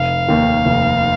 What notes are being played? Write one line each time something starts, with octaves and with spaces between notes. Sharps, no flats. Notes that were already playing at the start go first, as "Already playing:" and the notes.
Already playing: F1 F5
D#2 D#3
F1